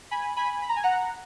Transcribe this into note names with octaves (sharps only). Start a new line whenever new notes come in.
G#5 B5
G#5 B5
B5
A#5
G#5
F#5 A#5